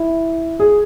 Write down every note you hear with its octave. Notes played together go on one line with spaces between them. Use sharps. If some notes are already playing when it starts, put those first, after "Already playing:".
Already playing: E4
G#4